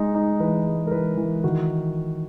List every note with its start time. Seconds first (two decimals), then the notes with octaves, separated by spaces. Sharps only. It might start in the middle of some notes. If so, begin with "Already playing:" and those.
Already playing: G#3 D#4
0.15 D#4
0.40 E3 B4
0.66 G#3
0.87 A#4
0.91 E3 B4
1.17 E3
1.44 D#3 F#4